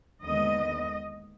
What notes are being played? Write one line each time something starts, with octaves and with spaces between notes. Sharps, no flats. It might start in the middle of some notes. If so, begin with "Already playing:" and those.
D#2 D3 G#3 B3 D#5